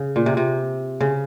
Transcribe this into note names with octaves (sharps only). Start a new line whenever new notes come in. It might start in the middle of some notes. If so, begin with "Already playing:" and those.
Already playing: C#3
A#2
C3
C3
C#3